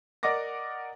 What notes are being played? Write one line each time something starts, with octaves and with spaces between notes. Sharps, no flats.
A#4 D5 D#5 F#5 D6 A#6